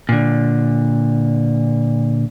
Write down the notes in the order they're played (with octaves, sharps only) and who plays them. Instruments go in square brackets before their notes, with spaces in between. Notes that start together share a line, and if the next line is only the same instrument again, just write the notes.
[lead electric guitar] A#2 D3